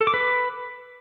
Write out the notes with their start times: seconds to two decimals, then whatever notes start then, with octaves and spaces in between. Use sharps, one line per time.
0.01 A4
0.07 D6
0.14 B4